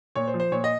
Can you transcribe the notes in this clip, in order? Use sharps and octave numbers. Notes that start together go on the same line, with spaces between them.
A#2 C#5
C5
F3
C5
A#2 C#5
D#5